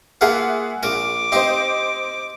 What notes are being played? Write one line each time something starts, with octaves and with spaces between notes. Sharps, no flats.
A#3 F4 G#4 A#4 E5 F#5
A#1 A#4 D6
C4 D#4 G4 C5 D#5